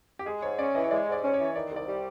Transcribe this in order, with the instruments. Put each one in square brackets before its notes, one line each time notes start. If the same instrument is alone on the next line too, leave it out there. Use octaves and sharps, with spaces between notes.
[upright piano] G4
[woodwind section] G#3 [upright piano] G#4
[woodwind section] G#2 [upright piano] C#5
[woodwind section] C#4 [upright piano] D5
[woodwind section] E3 [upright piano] D#5
[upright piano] C#5
[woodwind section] G#3 [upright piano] D5
[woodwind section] G#2 [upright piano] D5
[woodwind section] C#4
[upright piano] C#5
[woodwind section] E3
[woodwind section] D#3 [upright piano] D5
[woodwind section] C2
[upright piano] D5
[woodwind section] G3